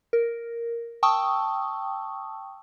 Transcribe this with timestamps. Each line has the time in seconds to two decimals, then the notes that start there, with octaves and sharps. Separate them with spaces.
0.13 A#4
1.03 G5 A5 C#6 D#6 E6